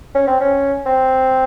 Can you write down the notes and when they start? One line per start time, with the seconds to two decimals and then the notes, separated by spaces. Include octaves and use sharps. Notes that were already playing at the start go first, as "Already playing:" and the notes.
0.15 C#4
0.28 C4
0.41 C#4
0.86 C4